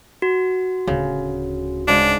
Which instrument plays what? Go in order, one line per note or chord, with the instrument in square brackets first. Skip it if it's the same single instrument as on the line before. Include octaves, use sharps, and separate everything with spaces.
[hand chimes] F#4
[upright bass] D1 D2 [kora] C#3
[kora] G#2 C#3 [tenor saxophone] D4